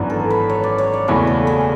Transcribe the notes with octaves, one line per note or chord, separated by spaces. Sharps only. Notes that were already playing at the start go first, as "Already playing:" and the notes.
Already playing: G#1 F#2 E3 B3 D4
A4
B4
C#5
D5
C#5
D5
F#1 E2 B2 A3 E4 B4
A4
G#4